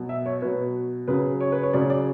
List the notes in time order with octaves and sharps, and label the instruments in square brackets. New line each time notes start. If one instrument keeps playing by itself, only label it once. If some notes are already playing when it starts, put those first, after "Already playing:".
Already playing: [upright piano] B2 F#3
E5
C#5
B2 F#3 B4
C#3 F#3 B4
C#5
B4
C#5
C#3 F#3 D5
D5